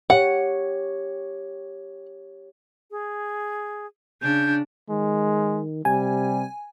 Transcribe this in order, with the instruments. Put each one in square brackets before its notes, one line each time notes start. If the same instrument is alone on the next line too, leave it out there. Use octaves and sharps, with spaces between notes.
[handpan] G4 C#5 [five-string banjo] F#5
[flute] G#4
[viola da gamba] C#3 D4 [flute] G6
[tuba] D#3 [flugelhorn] G#3
[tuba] C3 [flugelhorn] G3 [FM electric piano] G#5